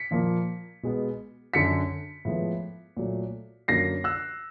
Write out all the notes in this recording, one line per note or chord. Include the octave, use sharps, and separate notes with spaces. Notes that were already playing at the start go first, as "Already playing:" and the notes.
Already playing: B6 C#7
A#2 F3 A#3
B2 G#3 B3
F#2 D3 F#3 B6 C#7
A2 F3 G#3 B3
A#2 F#3 A3
F#2 D3 F#3 A#3 A#6 C7
E6 F#6